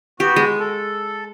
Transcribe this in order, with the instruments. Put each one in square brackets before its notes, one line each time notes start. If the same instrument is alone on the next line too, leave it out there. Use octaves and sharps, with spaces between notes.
[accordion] B3 F#4 [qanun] G4
[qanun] G#3
[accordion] A4